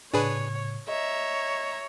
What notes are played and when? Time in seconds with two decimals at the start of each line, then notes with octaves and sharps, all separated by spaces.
0.14 A2 C#3 D4 G#4 B4 C#5
0.89 C#5 D#5 E5 A#5